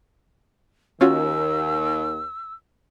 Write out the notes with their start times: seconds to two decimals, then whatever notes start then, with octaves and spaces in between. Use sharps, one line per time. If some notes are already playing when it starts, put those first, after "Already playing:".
1.01 D#2 D#3 C#4 F4 F#4 E6